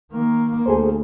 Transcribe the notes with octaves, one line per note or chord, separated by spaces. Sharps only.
D#3 A#3
D2 G#4 A4 C5